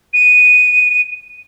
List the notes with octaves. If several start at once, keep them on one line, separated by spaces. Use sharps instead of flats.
D#7